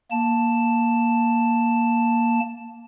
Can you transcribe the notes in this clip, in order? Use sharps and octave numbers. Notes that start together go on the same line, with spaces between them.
A#3 A5